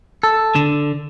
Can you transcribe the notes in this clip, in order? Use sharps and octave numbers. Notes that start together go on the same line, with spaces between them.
A4
D3